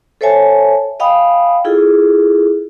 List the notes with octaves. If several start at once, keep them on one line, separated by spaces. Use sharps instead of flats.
A4 C5 C#5 E5 G#5 A5
D#5 F5 G5 G#5 B5 D#6
E4 F4 G#4 A4